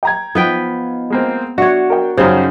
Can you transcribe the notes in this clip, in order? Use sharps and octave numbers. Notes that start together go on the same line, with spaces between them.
G5 A#5 G#6
F3 B3 D#4 F4 B4 G5
G#3 A#3 C4
D4 F#4 C#5 E5 F#5
A#4 G5
F#2 C#3 G3 C#4 D#4 C5